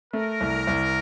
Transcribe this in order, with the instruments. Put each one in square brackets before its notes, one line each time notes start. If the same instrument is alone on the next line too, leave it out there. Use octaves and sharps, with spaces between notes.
[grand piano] A3 [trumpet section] A#4
[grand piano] C2
C2